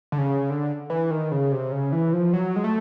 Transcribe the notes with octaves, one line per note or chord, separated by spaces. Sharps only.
D3
C#3
D3
E3
D#3
C#3
C3
C#3
E3
F3
F#3
G#3
A3